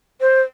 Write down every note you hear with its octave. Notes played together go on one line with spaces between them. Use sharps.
C5